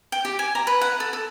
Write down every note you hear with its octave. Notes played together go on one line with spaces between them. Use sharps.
G5
G4
G#5
A#5
B4
F#5
A4
A4